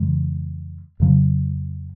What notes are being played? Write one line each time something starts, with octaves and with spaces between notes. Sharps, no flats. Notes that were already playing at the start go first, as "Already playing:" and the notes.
Already playing: F2 C#3 E3 G#3
F2 C#3 F#3